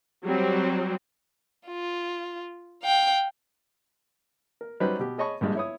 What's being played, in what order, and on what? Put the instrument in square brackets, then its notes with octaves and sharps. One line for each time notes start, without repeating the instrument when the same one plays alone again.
[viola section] F#3 G3 C4
[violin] F4
F5 G5
[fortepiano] A#4
F#3 G3 C#4 D#4 B4 C5
B2 G4
G#4 C#5 D#5 A5 B5 C#6
A#1 G2 G3 G#3
E4 C#5 D#6